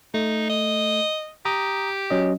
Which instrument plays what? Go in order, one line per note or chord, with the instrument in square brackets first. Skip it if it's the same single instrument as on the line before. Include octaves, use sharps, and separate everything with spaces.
[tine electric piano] A3 [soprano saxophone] D#4
[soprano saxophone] D#5
[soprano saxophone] G4 [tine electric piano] A#5 D#6
[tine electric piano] F#3 C#4 D#5